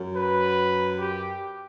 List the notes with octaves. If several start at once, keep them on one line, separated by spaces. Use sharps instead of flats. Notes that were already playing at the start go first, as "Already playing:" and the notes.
Already playing: F#2 F#3
B4
G4